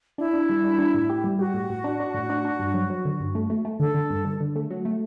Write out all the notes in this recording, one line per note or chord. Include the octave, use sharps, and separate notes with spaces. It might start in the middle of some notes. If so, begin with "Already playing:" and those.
D4 E4
D4
G3
D4
D4
A2
G4
G3
F#4 G4
A2
A2
D4
D4
A2
D4
D4
G2
F#3
F#3
D3
G2
A3
A3
A3
D3 A4
D3
G2
D3
D3
A3
F#3
A3